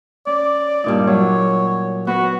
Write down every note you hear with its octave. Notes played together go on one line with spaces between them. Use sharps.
C#4 D5
G2 A#2 D#4
F#3 C#5
B3 F#4 B4